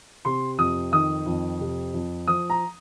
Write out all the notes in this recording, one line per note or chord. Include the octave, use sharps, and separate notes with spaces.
C3 C6
F2 D#6
D#3 D#6
F2
C3
F2
F3 D#6
A#5